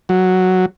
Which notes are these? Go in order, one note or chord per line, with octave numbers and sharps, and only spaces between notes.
F#3